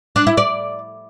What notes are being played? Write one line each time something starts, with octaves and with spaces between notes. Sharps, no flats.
D4
E4
D5